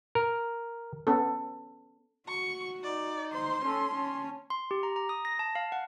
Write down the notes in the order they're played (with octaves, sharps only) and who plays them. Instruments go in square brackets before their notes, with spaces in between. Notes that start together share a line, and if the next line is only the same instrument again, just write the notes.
[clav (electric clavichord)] A#4
[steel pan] B3 C#4 A4
[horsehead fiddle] F#4 [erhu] C#6
[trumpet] D#4 [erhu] D5
[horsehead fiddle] C5 [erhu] C6
[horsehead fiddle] C#4 [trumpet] A4
[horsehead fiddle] C#4 [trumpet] A5
[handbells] C6
G4
A#5
A#5
D#6
A#6
A5
F5
F#5